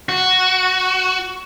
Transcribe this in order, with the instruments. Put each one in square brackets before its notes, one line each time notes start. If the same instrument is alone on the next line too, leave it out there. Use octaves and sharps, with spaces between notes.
[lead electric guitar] F#4